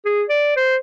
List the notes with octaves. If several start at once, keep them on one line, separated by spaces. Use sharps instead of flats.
G#4
D5
C5